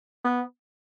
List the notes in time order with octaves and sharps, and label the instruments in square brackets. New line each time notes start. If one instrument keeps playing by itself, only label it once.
[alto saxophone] B3